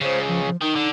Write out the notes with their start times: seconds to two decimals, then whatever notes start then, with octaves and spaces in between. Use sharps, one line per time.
0.01 C#2 C#3 C5
0.28 F3
0.47 F3
0.62 D#3 D#4
0.76 D3